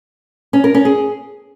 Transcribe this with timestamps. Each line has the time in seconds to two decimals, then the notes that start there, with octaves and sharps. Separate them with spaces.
0.53 C#4
0.64 A#4
0.75 C#4
0.85 G#4